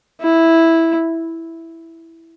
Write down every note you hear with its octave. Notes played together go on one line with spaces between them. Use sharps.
E4